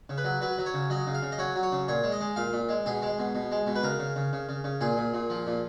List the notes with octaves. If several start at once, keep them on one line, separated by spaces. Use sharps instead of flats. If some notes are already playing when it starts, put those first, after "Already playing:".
C#3
B4
F#3
F#3 B4
F#3
C#5
C#3
F#3 D#5
C#3
F5
C#3
D#5
F#3 C#5
F#3
C#5
C#3
A#2 C#5
G#3
D#5
G#3
A#2 F5
A#2
G#3
B2 G#4
G#3
B2
B2
G#3
B2
B4
C#3 A#4
C#3
C#3
C#3
C#3
C#3
A#2 G#4
A#2
A#2
F3
A#2